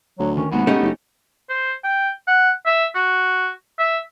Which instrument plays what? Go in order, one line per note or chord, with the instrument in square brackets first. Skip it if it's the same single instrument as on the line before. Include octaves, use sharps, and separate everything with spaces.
[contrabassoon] D2 [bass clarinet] F#3
[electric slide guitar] D#3 [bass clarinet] C#4
[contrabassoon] D#2 [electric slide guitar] F#3 G#3 C4 [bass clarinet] B3
[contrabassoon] G#2 [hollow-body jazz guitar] A3 C#4 D#4 [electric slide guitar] G4
[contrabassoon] F#1
[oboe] C5
G5
F#5
E5
F#4
E5